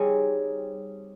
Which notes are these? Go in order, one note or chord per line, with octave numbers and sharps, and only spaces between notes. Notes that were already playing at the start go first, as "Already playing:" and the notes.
Already playing: G3 C4 D#4 G#4 C#5